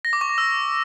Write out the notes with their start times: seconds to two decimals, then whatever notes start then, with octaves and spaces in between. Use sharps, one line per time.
0.05 A#6
0.13 D6
0.21 C#6
0.30 D6
0.38 E6